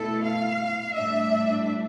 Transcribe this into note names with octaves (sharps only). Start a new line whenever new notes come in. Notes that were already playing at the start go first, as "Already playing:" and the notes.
Already playing: B2 A3 E4 A4
F5
A2 G3 D4 E5